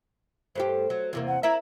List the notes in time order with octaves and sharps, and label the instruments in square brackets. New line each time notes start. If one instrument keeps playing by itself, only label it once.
[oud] G2 A3 G4 [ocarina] C5
[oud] F#3
E2 C3 A#3
[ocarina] F#5
[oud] E4 A#4 E5 [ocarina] A#5